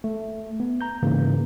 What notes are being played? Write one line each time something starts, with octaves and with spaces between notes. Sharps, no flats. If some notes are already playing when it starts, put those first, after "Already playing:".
A3
B3
A#5 G6
G#2 C#3 E3 A#3